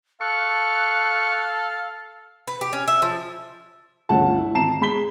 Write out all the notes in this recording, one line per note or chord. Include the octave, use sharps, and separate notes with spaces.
A4 F5 C#6 F#6
B4
G4
C#4
E5
F3
G1 C#2 A3 F4 F#5 A5
E4
G#1 A5 A#5 C7 E7
G#3 B5 B6 G7